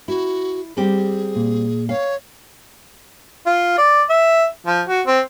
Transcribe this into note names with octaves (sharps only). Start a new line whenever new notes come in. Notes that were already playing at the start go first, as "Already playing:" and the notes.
E4 F#4
G3 C4 G4 G#4
A#2
C#5 F5
F4
D5
E5
F3
F#4
C4